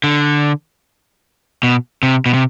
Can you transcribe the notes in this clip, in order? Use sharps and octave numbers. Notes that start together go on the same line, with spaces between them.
D3
B2
C3
B2
C3